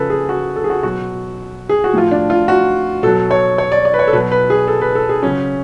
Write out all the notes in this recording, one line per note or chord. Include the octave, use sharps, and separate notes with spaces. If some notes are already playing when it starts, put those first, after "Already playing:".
Already playing: C#3 F3 A4 B4
G#4
F#4
A4
G#4
F#4
B2 F#3 F#4
G#4
F#4
A2 F3 F4
D4
F4
F#4
B2 F#3 A4
C#5
C#5
D5
D5
B4
C#5
A4
B2 F#3 B4
B4
G#4
A4
B4
A4
G#4
C#3 F#3 C#4